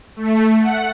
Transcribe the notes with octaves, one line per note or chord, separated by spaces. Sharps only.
A3
F#5